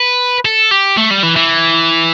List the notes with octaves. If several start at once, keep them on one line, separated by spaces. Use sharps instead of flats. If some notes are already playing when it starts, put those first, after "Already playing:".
Already playing: B4
A4
G4
A3
G3
E3
E3